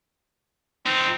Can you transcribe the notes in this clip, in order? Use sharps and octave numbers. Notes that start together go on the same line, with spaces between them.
F3 C4 D#4